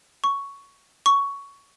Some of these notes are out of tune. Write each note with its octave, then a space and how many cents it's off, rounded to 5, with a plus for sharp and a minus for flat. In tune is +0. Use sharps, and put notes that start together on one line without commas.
C#6 +5
C#6 +10